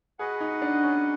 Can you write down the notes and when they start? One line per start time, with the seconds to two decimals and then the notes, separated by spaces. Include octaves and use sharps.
0.19 F#4 G#4 B4 D#5 F#5
0.41 D#4
0.62 D4
0.83 C#4